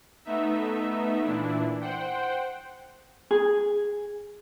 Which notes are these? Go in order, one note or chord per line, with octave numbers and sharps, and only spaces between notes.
A3 B3 D#4 E5
A#2 E3 D4 E4
C5 F#5 G5
G#4